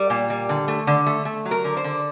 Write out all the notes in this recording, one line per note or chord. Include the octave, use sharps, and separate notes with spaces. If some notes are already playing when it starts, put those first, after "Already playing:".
Already playing: G3 A#4
A#2
G3
D3
A3
D3
A3
A3
F#3
A#4
D3
C5
D3